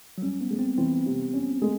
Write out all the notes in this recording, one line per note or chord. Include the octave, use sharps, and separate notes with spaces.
F#3
G3 C#4
B3
G#3
C4
E3 C4
C3
C#4
G#3